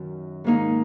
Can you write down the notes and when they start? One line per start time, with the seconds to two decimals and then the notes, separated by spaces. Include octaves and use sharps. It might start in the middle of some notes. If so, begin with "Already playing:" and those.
Already playing: F#2 D#3
0.44 G#2 D#3 A#3 D#4